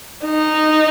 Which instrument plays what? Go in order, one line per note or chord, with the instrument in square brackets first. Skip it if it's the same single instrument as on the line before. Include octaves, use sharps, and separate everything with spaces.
[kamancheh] D#4